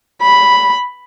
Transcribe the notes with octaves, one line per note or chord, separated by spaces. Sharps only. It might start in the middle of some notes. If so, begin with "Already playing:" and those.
B5